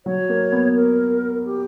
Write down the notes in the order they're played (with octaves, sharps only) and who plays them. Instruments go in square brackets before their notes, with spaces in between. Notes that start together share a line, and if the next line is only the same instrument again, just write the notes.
[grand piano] F#3 [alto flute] C#5
[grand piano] A#3
B3
[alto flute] A#4
G4